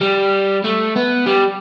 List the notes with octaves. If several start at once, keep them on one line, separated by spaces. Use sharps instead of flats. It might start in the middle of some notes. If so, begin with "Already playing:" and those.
G3
A3
B3
G3